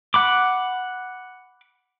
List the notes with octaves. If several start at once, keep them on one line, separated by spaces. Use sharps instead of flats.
F#5 B5 D6